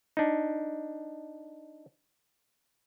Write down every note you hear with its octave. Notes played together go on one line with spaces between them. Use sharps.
D4 D#4